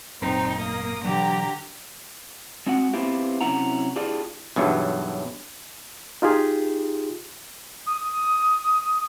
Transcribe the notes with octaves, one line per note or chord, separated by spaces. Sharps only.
G#1 F#2 A#2 C4 D#4
A#3 D#6
B2 D3 E3 F#3 G4 A#5
G#3 C4 F#4 F#5
B3 C4 E4 F4 G4
C3 F#3 C#4 E4 F#5 A#5
D4 E4 F4 G4 G#4 D5
B1 E2 G2 F#3
D#4 F4 G4 G#4
D#6